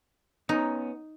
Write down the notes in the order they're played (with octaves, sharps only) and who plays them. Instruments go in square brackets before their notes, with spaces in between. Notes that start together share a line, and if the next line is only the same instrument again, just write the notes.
[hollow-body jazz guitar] B3 C#4 [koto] D#4